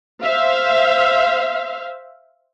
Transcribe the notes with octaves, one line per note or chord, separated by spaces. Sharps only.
C5 E5 F5